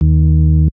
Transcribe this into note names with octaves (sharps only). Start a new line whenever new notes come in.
D#2